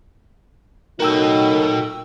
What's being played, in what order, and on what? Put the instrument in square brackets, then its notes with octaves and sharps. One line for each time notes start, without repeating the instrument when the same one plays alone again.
[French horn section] F#3 A3 D#4 [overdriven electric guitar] F#4 D#5 [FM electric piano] A#4 G5 E6